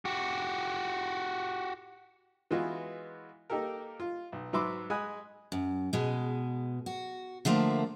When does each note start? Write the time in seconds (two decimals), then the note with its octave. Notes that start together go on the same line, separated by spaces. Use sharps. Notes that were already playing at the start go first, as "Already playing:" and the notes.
0.05 F#4 G4
2.51 E3 G#3 B3 F4 F#4
3.50 A#3 D#4 G4 A4 A#4
4.00 F4
4.32 B1
4.53 G#2 F#3 B4 E5 C6 D6
4.90 G#3 G#5 B5 D#6 F#6
5.52 F#2
5.93 B2 G#3
6.86 F#4
7.45 D3 F3 A3 A#3